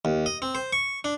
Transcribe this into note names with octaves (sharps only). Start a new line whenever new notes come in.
D#2
D#5
C4
C5
C#6
D4